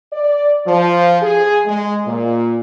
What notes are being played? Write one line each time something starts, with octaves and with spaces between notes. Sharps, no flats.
D5
F3
G#4
G#3
A#2